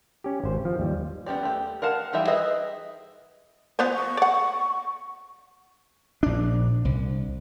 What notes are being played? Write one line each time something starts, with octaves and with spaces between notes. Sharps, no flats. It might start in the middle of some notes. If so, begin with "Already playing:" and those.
C#4 G4
G#1 C5
F3
D#2 G3
B3 C#4 G4 D5
A3 G4
A#4 F5 F#5 A5
E3 G3 D#4 G4 E5
G#4 B4 D#5 E5
F3 B3 C5
C#6
D5 F#5
A#1 D4
C2